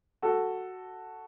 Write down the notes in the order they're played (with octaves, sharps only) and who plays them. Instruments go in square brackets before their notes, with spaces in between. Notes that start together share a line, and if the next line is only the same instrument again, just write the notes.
[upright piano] F#4 A4